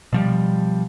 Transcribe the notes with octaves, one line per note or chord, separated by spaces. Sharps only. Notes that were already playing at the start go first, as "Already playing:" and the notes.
B2 F3 G3